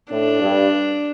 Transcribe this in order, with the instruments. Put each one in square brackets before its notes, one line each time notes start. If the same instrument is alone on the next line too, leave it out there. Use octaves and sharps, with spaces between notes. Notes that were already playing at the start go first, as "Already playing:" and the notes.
[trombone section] A2 [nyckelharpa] D4
[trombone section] G2